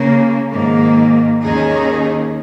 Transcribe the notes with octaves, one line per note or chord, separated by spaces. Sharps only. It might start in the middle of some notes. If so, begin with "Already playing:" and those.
Already playing: C#3 A#3 C#4
G#2 D#3 A#3
D#2 D#3 C#4 D#4 G#4